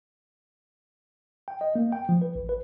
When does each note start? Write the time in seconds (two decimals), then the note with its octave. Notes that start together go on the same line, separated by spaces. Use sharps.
1.48 G5
1.61 D#5
1.75 A#3
1.92 G5
2.09 F3
2.22 B4
2.35 A1
2.49 B4